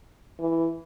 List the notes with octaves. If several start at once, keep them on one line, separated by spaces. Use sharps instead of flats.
E3